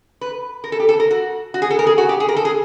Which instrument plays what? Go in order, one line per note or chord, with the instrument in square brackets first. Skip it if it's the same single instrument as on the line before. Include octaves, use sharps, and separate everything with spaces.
[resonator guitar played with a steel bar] B4
A#4
A4
G4
A4
A#4
F#4
F#4
G#4
A4
A#4
G#4
F#4
G4
G#4
A#4
A4
G#4